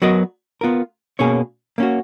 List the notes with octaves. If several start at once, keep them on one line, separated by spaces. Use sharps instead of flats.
F#3 B3 F#4 A#4 D#5
B3 F4 A#4
B2 A#3 C#4 G#4 C#5
A#3 C#4 F#4